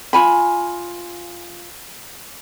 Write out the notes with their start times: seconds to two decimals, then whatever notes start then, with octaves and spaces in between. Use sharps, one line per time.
0.13 F4 G#5 B5